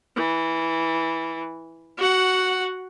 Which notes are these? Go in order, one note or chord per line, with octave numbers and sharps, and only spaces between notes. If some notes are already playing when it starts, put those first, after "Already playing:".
E3
F#4 F#5